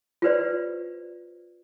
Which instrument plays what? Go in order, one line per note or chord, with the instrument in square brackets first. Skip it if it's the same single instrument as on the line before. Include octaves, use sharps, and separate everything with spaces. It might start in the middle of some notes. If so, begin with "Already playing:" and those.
[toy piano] F4 G4 B4 C5 D5